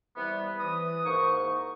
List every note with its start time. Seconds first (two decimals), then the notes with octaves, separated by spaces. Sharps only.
0.16 C3 E3 G3 B3
0.59 E3 D#6
1.05 G#2 A#3 D#4 C#6